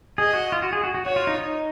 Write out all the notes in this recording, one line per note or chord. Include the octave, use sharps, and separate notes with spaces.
G#4 D#5
F#4
F4
F#4
G#4
F#4
F#4
F#4 C#5
F4
D#4
D#4